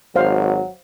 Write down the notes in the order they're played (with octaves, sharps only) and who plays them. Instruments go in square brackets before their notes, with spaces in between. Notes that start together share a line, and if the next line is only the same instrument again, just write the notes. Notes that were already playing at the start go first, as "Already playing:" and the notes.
[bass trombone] G#1 [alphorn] F#3 [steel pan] C5 F5